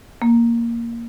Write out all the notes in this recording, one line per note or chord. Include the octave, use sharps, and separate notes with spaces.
A#3